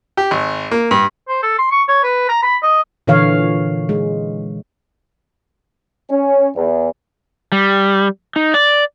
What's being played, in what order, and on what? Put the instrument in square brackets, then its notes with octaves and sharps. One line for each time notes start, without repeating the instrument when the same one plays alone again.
[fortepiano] G4
G#1
A#3
G2
[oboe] C5
A4
C6
C#6
C#5
B4
A#5
B5
D#5
[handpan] A#2 D3 E3 C#5 F5
G#3
[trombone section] C#4
E2
[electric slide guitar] G3
D#4
D5